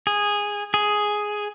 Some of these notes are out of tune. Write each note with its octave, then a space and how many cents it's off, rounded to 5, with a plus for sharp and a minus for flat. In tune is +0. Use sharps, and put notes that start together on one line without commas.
G#4 -10
G#4 +5